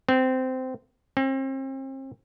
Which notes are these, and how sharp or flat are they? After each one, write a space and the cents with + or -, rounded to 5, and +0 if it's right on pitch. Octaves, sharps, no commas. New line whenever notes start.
C4 -15
C4 +40